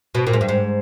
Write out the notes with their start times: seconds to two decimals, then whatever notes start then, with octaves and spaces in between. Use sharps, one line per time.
0.15 B2
0.27 A#2
0.33 G#2
0.41 G2
0.49 G#2